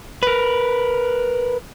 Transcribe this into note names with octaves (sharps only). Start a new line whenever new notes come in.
A#4 B4